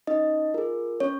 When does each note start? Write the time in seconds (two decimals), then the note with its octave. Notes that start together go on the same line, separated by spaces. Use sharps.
0.07 C#4 D#4 D#5
0.54 F4 G#4 A#4
1.00 C#4 C#5